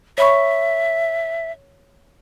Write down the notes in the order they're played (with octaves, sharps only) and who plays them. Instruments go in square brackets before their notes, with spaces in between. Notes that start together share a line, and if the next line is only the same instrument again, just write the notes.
[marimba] C#5 B5 C#6 [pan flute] E5